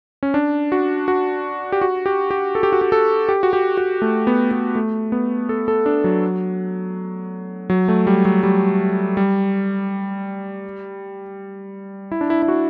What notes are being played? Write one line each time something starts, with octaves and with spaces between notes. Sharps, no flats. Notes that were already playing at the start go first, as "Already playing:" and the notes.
C#4
D4
F#4
F#4
G4
F#4
G4
G4
A4
G4
F#4
G4
A4
G4
F#4
G4
F#4
A3
B3
B3
A3
B3
A4
A4
D4
F#3
F#3
A3
G3
F#3
G3
G3
E4
D4
E4
E4
F#4